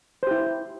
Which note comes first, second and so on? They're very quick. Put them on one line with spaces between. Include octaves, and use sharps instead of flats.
C5 G4 E4